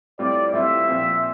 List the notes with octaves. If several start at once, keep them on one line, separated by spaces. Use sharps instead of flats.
A2 G3 C4 F4 D5
A2 G3 C4 F4 E5
A#2 F3 C4 F4